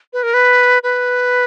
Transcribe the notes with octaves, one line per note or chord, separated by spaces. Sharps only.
B4
A#4
B4
B4